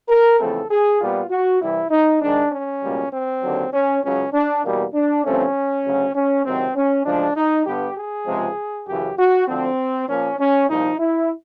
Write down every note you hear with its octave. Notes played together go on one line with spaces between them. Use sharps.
A#4
E2 C#3 F3 A3 C4 A4
G#4
A#2 G3 B3 F4
F#4
C2 C3 E3 G3 E4
D#4
G#2 D#3 G#3 D4
C#4
C#2 B2 G3 A#3
C4
D#2 D3 F#3
C#4
C#2 C#3 F#3 C#4
D4
E2 B2 G3 A#3
D4
G2 D3 F3 A3 C4 C#4
D2 C#3 F#3
C#4
C#2 C3 D#3 F#3 C4
C#4
D2 C#3 F3 G#3 D4
D#4
G2 D3 G3 B3 G4
G#4
C#2 C3 F3 G#3 C4
F#2 C#3 E3 G4
F#4
D2 D3 F3 C4
A#2 F3 A#3 C#4
C#4
C2 A#2 F3 D#4
E4